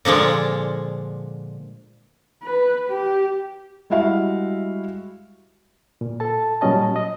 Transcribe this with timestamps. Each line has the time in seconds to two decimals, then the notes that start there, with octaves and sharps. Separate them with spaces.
0.05 A#2 D3 F3 G#3
2.43 B4
2.89 G4
3.90 G3 G#3 E4 F#4 E5 F5
6.01 A#2
6.20 A4 A5
6.61 A#2 F#3 G3 C#4 D#5 A5
6.96 D#5